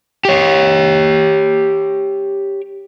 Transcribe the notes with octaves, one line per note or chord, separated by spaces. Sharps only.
G4 C#5